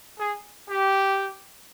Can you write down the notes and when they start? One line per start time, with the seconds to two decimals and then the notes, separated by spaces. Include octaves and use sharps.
0.19 G#4
0.69 G4